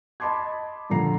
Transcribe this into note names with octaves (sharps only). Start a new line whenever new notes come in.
D#5 A5 B5 C6 D6 G#6
G2 A#2 D3 F3 A#5 C7